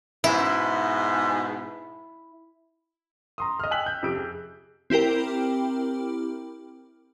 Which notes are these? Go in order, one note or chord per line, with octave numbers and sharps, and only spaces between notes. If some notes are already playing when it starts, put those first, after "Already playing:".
G#2 B2 E4
A#5 C6 D#6
D#5 F6
G5 G#5 E6 F#6 B6 F#7
G6
F2 C3 G4 D7
G#4
C4 E4 G4 A#4 G5